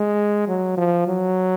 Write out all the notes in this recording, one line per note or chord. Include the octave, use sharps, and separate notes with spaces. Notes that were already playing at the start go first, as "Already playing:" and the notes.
Already playing: G#3
F#3
F3
F#3